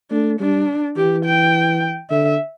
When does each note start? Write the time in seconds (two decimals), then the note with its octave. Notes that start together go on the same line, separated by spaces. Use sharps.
0.11 A3 D4
0.40 G3 D4
0.96 E3 G4
1.25 G5
2.10 D3 E5